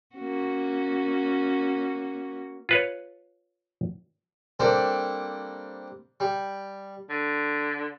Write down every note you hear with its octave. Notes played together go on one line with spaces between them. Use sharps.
A#3 C#4 F#4
F4 B4 C#5
G3 A#3 C4 D4 A4
G3
D3